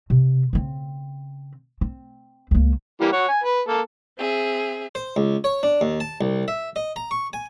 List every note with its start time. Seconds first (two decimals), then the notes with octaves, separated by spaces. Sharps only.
0.10 C3
0.53 C#3 C4
1.81 C4
2.51 C#2 A#3
3.01 E3 G3 A#3
3.13 C#5 F#5
3.29 G#5
3.44 B4
3.68 A#3 A4
4.18 C4 G#4 E5
4.95 C5
5.16 C#2
5.44 C#5
5.63 D4
5.81 D#2
6.00 A5
6.21 C2
6.48 E5
6.76 D#5
6.96 A#5
7.11 C#6
7.33 G#5